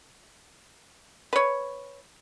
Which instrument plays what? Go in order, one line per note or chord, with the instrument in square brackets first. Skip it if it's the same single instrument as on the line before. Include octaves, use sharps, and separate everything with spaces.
[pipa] B4 C#5